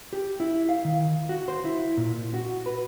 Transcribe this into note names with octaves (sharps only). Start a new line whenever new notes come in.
G4
E4
F5
D#3
F#4
C5
E4
A#2
F#4
B4